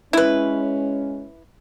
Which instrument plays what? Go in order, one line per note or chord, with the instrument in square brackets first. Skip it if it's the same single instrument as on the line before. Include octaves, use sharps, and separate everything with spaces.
[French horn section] G#3 C#4 [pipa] E4 B4